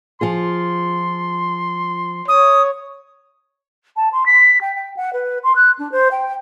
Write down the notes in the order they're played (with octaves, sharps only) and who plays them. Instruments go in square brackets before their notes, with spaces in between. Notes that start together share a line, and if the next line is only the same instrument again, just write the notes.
[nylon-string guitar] F3 F4 G#4 [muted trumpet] C6
[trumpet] C#5 [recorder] D#6
[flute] A5
C6
B6
G5
G5
F#5
B4
C6
F#6
D4
C5
G5